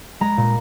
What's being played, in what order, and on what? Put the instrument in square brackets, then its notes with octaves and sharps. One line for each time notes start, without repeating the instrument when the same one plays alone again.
[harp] G#3 A#5
A#2